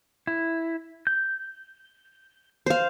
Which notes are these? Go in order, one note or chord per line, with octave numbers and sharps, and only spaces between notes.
E4
G6
C5 F5